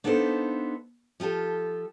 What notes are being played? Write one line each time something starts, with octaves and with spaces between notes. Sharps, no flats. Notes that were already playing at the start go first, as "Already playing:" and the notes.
A#3 B3 D4 D#4 A4 C5
F3 F4 G4 A4